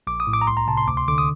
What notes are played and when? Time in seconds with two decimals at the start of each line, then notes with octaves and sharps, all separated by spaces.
0.07 A#1 D6
0.20 D#6
0.27 A2
0.34 D6
0.41 A#5
0.47 C2 C6
0.57 A#5
0.68 C3 A5
0.77 C6
0.88 D2 D6
0.97 C6
1.08 D3 D6
1.18 D#6